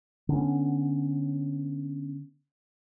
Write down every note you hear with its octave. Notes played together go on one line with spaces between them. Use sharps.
D3 B3 C#4